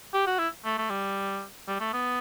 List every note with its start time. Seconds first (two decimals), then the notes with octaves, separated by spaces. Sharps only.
0.14 G4
0.27 F#4
0.39 E4
0.65 A3
0.78 A3
0.90 G3
1.68 G3
1.80 A3
1.93 B3